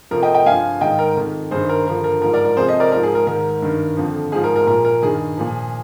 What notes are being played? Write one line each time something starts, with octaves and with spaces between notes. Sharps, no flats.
F2 C3 F3 A#4
D#5 G5
D#5 G5
G2 F3 F5 G#5
G#2 D#3 D#5 G5
A#4
F2 D#3
G2 D#3 G#4 C5
A#4
G2 D3 F3 A#4
A#4
G#2 F3 A#4
A#4 D5
A#4
F2 C3 F3 G#4 C5
C5 D#5
A#4 D5
G#2 F3 A#4
G#4
A#4
G#2 D#3 A#4
G2 D#3
F2 D3 F3
G#2 F3 G#4
A#4
A#4
A#2 F3 A#4
A#4
G2 D#3 G#4
A#2 F3